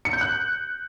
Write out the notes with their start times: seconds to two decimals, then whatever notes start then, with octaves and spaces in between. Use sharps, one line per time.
0.05 C#7
0.13 G6
0.21 F#6